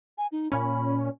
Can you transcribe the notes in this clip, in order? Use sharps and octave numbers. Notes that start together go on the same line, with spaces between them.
G#5
D#4
A#2 C#4 B5